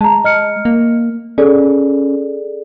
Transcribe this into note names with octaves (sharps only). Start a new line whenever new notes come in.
G#3 A5 A#5
D#5 F6 C#7
A#3
C#4 G#4 A4 D5